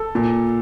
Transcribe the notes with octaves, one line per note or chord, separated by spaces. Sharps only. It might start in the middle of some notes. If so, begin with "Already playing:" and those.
Already playing: A4
A#2